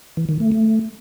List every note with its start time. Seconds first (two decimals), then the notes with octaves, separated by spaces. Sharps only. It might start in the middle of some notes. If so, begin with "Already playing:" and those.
0.17 E3
0.29 D#3
0.40 A3
0.52 A3